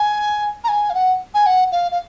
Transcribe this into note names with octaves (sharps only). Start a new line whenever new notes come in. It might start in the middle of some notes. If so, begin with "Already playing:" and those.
Already playing: G#5
A#5
G#5
F5
F#5
G#5
F#5
F5
F5